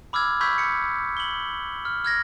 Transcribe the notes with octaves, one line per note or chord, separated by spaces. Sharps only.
B5 D6 E6 F6 G#6
B5 C#6 E6 G6 G#6 B6
C#7
F#7 G7
F6
F6 G#6 A#6